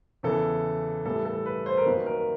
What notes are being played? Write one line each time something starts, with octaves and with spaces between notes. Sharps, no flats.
E2 C#3 E3 A4
A2 E3 G3 A4
A4
B4
C5
A#4
F#2 D#3 F#3 A#3 B4
A#4